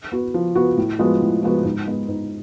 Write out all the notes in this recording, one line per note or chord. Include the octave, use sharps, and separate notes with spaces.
B3 F#4
F3
B3 F#4
A2
F3 G#3 B3 F#4
A2
F3 G#3 B3 F#4
G#2
G#3 B3
G#2